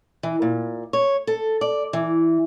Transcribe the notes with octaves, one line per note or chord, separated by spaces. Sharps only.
E3
A#2
C#5
A4
D5
E3